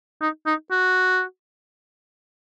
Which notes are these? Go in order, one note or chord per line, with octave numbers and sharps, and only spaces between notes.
D#4
D#4
F#4